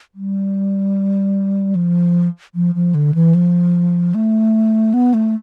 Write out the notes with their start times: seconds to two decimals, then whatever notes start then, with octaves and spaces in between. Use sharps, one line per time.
0.15 G3
1.75 F3
2.55 F3
2.75 F3
2.95 D3
3.15 E3
3.35 F3
4.15 A3
4.94 B3
5.14 A3